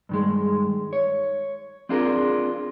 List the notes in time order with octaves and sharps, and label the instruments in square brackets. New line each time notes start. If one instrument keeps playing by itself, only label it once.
[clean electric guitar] G2 D#3 G#3
C#5
C4 D4 F4 G#4 A#4